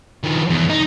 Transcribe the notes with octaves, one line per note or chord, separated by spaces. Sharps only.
D#3 F3
E2
D#4